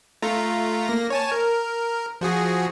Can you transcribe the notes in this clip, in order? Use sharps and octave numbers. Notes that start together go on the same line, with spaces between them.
A3 F4 A#5
A#3 A#6
C#5 G#5 A5
A#4
F3 F#4 G#4